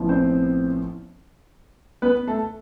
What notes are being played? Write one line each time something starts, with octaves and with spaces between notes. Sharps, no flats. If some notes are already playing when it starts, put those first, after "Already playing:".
Already playing: A1 A2 F3 B3
C4 C5
B3 B4
A3 A4